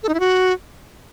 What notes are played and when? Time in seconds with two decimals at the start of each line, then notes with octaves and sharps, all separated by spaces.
0.03 A4
0.09 D#4
0.14 E4
0.20 F#4